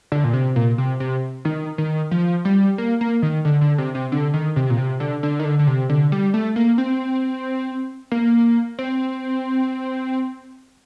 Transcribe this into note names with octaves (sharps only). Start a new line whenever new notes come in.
D3
A#2
C3
A#2
C3
C3
D#3
D#3
F3
G3
A#3
A#3
D#3
D3
D3
C3
C3
D3
D#3
C3
A#2
C3
D3
D3
D#3
D3
D3
C3
D3
G3
A3
A#3
C4
A#3
C4